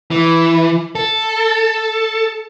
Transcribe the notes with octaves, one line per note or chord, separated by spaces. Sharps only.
E3
A4